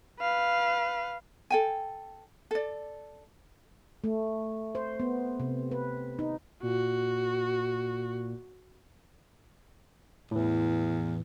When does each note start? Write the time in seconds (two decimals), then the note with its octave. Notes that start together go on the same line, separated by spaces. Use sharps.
0.20 B4 F5
1.50 A4 G5 G#5
2.51 A4 D5
4.04 A3
4.75 C5
5.00 B3
5.40 C3
5.71 B4
6.19 D#4
6.63 A#2 F#4
10.31 E2 A2 E3